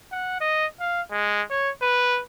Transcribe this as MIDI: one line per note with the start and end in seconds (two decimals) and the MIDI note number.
0.12 0.40 78
0.41 0.66 75
0.80 1.01 77
1.11 1.42 56
1.50 1.70 73
1.82 2.21 71